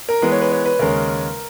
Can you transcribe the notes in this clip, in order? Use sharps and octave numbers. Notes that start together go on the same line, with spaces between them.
A#4
E3 G#3 B3 B4
C#5
B4
C#5
B4
D#2 C#3 G#3 C#4 A#4